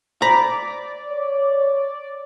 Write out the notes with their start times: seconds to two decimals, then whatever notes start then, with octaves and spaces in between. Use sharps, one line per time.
0.22 C5 D5 A#5 B5 B6
1.10 C#5